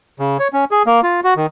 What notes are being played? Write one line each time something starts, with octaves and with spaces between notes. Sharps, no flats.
C#3
C#5
C#4
G#4
A#3
F4
F#4
D#3